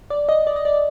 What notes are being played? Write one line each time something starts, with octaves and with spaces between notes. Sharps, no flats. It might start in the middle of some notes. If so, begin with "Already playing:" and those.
D5
D#5
D5
D#5
D5